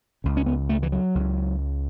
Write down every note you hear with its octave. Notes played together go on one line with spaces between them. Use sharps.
C#2 C#3
C#4
B3
A3
E3
F#3
C#2 C#3